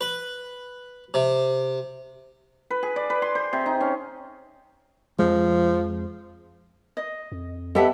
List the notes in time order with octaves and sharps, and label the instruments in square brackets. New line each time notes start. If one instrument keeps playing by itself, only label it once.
[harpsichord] B4
C3
[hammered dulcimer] B4
G#4
D5
B4
C6
C5
C3
D#4
C#4
[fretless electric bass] F2 G#3 [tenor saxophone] F3
[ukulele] D#5
[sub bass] F2
[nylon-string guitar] B3 G4 [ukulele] A4 E5 F#5 [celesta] D#5 G5 A5